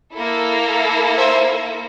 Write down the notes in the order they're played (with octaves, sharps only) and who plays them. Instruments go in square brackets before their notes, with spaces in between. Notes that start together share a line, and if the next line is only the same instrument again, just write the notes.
[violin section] A#3 E4 A4
C5 E5